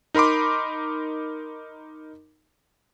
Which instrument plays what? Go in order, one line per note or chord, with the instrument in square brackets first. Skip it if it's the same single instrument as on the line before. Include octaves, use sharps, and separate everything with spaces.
[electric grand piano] D#4 A#4 B5 C6 D6